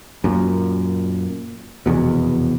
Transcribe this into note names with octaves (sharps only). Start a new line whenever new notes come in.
F#2 A#2
F1 E2 B2